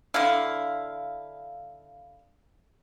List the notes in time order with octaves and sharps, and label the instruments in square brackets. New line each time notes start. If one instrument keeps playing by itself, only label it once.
[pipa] D3 E4 [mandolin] F5